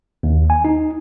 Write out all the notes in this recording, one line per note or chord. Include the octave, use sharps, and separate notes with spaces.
D#2
G#5
D#4